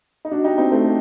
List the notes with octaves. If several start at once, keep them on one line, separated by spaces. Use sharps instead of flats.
D#4
D4 F#4
D#4 G4
C4 D#4
A3 C4